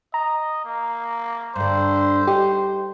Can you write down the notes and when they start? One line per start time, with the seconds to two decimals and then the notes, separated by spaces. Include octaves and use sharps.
0.14 D#5 A#5
0.65 A#3
1.56 G2 D3 C5
2.28 D#4 G4